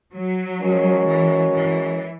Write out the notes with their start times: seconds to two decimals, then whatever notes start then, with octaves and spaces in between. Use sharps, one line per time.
0.14 F#3
0.61 G#3 C#4 F#4 A#4 C#5
1.06 E3
1.53 E3